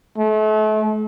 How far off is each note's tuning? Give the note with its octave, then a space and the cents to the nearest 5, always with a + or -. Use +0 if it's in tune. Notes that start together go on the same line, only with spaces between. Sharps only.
A3 -35